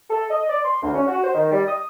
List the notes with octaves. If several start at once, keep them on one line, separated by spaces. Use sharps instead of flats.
A4
D#5
D5
C6
D2
C#4
F#4
C5
D#3
G3
D#6